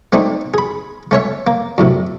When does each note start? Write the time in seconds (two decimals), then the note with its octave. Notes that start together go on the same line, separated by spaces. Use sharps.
0.12 A3 C4 D4 D#4
0.54 G#4 B5
1.11 A3 C#4 C#5 E5
1.47 A#3
1.78 F#2 A2 C3